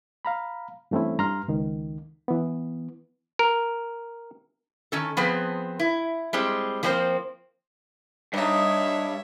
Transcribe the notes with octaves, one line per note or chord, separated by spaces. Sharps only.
F5 A#5 B5
G2 E3 A3 C4 C#4 E4
G2 A#5 C6 F6
C#2 D#3
E3 B3
A#4
D#3 C#4 A4
F3 B3 C4 G#4 B4
E4
G3 G#3 C4
F3 A#3 C4 D4 C5
G2 G3 D#4 C#5 E5